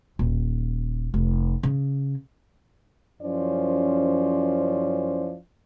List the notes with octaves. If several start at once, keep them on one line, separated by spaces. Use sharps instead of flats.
D#1
F1
C#3
F#2 F3 C#4 E4 C5 D5